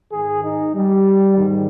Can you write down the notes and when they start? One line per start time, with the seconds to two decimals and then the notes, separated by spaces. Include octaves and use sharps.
0.11 G#2 D#3 G#4
0.42 D#4
0.74 G3
1.37 G#2 D#3